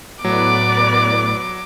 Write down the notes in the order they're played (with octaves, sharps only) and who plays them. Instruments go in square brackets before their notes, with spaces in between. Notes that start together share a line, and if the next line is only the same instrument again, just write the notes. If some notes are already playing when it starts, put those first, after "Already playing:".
[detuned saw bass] A2 [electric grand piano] F#3 [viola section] B3 B4 D5 [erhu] D6